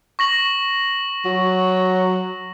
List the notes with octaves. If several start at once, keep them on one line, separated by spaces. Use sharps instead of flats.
C#6 A#6 F#7
F#3